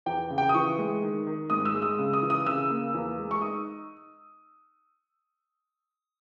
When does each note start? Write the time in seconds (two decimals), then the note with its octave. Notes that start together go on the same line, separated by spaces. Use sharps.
0.06 E2 G5
0.30 C#3
0.38 G5
0.49 D#6
0.54 E3 C#6
0.78 G#3
1.02 D#3
1.27 D#3
1.50 G#2 D#6
1.65 E6
1.74 G#3
1.82 D#6
1.99 C#3
2.13 D#6
2.22 E3
2.30 D#6
2.46 C#3 E6
2.70 A#3
2.94 E2
3.19 G#3
3.31 C#6
3.41 D#4 D#6